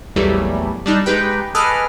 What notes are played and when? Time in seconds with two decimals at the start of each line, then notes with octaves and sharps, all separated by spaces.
0.16 A#1 E2 E3 F#3 G3 A3
0.86 G3 D4 D#4
1.06 G#3 D#4 G4 B4 G5
1.55 G#4 A4 B4 D#5 D6 F6